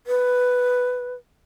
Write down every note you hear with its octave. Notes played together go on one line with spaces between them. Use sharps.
B4